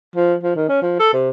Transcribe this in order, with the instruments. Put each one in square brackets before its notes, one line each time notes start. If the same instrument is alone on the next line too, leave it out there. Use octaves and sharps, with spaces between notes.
[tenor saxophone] F3
F3
D#3
C#4
F3
A4
C3